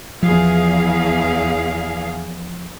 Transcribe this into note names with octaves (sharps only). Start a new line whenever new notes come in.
E2 F3 G#4 F5